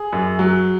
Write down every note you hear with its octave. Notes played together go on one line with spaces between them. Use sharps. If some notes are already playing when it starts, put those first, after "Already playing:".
Already playing: G#4
F#2
F#3